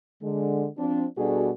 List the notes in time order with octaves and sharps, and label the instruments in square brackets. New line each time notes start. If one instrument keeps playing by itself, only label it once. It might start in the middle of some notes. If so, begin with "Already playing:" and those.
[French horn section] D3 G#3
F3 C4 D4
B2 G3 D4 F#4 G#4 A4